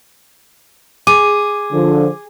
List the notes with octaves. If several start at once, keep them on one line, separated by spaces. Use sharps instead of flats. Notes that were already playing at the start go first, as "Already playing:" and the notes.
G#4 D6 D#7
D3 F3